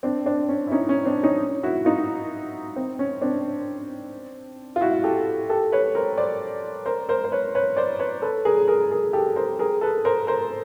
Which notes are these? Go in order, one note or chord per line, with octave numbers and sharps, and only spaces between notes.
C4 D4
C4 D4
C#4
E4
C#4 D#4
C#4
C4 D4
C#4 D#4
E4 F#4
D#4 F4
C4
C#4
C4 D4
F4
E4 F#4
G4 A4
G4 A4
B4 C#5
A#4 C5
C5 D5
A#4 C5
A#4 C5
C5
B4 C#5
B4 C#5
C5 D5
B4 C#5
A4 B4
G#4 A#4
G#4 A#4
G#4 A#4
G4 A4
A#4 C5
G#4 A#4
A4 B4
A#4 C5
A#4 C5